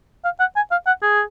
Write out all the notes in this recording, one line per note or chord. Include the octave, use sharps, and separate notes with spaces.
F5
F#5
G#5
F5
F#5
G#4